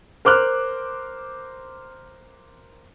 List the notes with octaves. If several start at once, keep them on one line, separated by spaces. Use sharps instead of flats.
A#4 C5 D6 F6 F#6